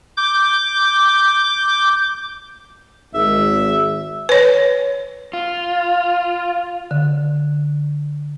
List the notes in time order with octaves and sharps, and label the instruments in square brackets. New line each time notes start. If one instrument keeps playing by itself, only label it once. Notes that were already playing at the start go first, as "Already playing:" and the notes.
[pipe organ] D6 G6
[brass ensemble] G#1 [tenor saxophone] E5
[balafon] B4 C#5
[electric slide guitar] F4
[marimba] D3